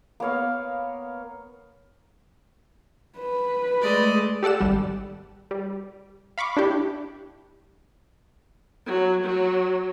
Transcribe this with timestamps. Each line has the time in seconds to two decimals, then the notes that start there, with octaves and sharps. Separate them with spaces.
0.20 A#3 B3 C#5 F5
3.19 B4
3.81 G#3 A3 D5 D#5
4.43 G4 A4 D5 F#5 E7
4.61 G#1 G3
5.51 G3
6.38 F5 B5 C#6 D6
6.57 D4 E4 G4
8.86 F#3
9.23 F#3